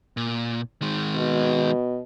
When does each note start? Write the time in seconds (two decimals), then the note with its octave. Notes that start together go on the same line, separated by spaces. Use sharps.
0.17 A#2
0.82 D#3 G#3
1.16 B2